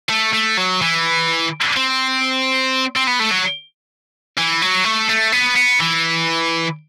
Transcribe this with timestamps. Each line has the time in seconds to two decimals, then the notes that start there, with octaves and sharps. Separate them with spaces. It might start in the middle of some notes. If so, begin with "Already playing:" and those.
0.09 A3
0.33 A3
0.58 F#3
0.82 E3
1.77 C4
2.96 C4
3.07 B3
3.19 A3
3.31 F#3
4.38 E3
4.62 F#3
4.85 A3
5.09 A3
5.32 B3
5.56 B3
5.80 E3